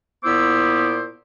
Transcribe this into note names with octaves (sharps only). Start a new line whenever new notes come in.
A#2 B3 E4 C5 D6 E6